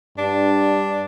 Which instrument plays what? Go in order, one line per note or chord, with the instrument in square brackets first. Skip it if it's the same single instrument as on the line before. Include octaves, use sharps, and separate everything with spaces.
[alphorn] G2 [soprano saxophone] D4